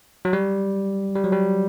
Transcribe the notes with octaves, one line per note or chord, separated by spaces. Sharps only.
F#3
G3
G3
F#3
G3